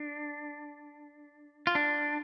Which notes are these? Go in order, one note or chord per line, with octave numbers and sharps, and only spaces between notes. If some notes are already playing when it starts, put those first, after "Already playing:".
Already playing: D4
F4
D4